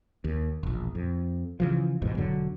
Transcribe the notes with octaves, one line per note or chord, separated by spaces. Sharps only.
D#2
E1 A#1
F2
C#3 E3 F3
G#1 E2 G#2 B2
E1 D3 F#3